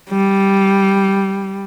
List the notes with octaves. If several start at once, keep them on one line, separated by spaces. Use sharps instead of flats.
G3